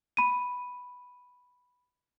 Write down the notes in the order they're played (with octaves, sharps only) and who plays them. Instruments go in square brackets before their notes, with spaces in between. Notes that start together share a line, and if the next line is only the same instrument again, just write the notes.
[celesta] B5 D#7